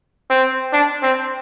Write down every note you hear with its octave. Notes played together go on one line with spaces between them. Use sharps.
C4
D4
C4